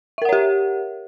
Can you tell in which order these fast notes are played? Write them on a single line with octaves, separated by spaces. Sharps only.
E5 A#4 F#5 C#5 G4